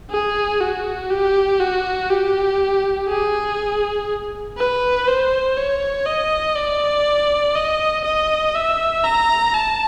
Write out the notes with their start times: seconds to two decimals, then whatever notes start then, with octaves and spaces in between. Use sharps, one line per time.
0.11 G#4
0.60 F#4
1.10 G4
1.60 F#4
2.10 G4
3.08 G#4
4.57 B4
5.07 C5
5.57 C#5
6.06 D#5
6.56 D5
7.55 D#5
8.05 D#5
8.55 E5
9.04 A#5
9.54 A5